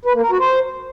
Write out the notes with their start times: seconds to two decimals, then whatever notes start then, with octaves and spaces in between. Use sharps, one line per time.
0.05 B4
0.14 A#3
0.22 A#4
0.31 F#4
0.39 C5